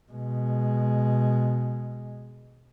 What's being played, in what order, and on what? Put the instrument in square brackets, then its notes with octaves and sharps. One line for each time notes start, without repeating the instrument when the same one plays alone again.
[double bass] B2 G#3